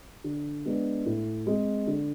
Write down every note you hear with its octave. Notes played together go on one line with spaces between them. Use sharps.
D3
G#3 B3 D4
A2
G#3 C4
D3